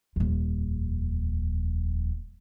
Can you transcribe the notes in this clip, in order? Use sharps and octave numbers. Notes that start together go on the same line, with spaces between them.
D#1 F2